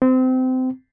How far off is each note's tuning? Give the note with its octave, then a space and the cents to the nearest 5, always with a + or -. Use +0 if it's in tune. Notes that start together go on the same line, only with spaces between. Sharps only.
C4 -25